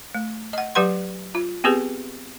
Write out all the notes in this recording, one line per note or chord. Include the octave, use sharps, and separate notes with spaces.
A3
D#5 F#5
F#3 G4 B4 F#5 C6
F4
B3 C4 G4 G#4 B4